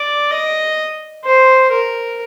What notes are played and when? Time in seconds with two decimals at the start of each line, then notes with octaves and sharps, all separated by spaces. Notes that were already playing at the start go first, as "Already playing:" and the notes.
Already playing: D5
0.31 D#5
1.25 C5
1.72 A#4